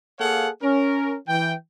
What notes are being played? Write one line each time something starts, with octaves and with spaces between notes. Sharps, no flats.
A#3 G#4 A4 C#5 F5 F#5
C#4 A#4
E3 G5